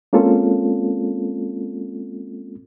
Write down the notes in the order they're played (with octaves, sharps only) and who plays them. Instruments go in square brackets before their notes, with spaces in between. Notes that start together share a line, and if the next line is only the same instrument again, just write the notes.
[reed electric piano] G#3 A#3 C4 C#4 F4 A4